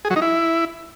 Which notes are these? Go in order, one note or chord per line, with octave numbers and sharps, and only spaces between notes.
G#4
F#3
D#4
E4